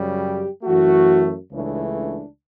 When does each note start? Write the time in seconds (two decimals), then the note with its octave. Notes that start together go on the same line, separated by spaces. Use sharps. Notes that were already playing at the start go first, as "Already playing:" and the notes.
Already playing: F#2 C#3 G3
0.18 G4
0.63 F#2 E3 A3 F#4
1.52 C#2 C#3 E3 A3 D4
1.96 D4